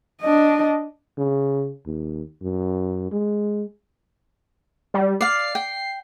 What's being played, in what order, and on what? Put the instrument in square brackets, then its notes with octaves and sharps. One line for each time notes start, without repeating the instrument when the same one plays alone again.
[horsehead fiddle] D4 D#5
[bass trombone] C#3
D#2
F#2
G#3
[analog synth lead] G3
[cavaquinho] D5 F5 [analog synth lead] C7
[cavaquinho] G5